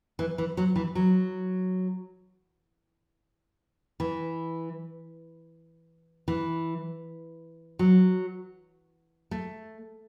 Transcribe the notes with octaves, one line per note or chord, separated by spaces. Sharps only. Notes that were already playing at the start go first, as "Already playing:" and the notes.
E3
E3
F#3
E3
F#3
E3
E3
F#3
A3